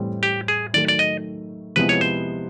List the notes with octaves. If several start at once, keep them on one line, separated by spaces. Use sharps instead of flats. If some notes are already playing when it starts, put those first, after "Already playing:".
Already playing: A2 E3 G3 C4
G4
G#4
D#3 F#3 A3 D5
D5
D#5
C3 F3 G#3 B3 E4 B4
C#5
C5